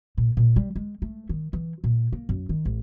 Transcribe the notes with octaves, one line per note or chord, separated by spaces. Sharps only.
A#2
A#2
G3
G#3
A3
D#3
E3
A#2
A#3
F#2
D#3
A1